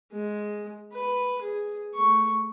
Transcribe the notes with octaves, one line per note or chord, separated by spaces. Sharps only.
G#3
B4
G#4
A3 C#6